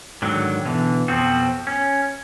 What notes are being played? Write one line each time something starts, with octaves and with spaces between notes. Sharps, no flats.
G#2 D3 D#3 F#3
B2 D3 E3
F2 B2 F3 C4 F#4
C#4